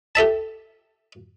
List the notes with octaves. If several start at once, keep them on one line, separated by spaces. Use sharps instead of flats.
G4 A4 E5 A5